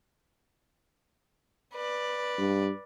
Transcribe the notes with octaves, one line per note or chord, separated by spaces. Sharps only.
B4 D5
G2